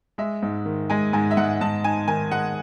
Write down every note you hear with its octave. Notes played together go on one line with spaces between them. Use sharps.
G#3 E5
G#2
D#3
G#3 G#5
G#2 G#5
E5
G#2 F#5
G#2 A5
D#4 G#5
D#3 G#5
G#3 F#5